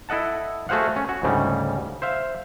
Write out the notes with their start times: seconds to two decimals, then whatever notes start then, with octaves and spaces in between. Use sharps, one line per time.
0.09 E4 A4 D#5 F#5 A5
0.69 A3 F#4 G#4 C5 F5 F#5
0.96 C#4
1.09 F#4
1.23 D2 G#2 C#3 G3
2.02 C5 E5 F5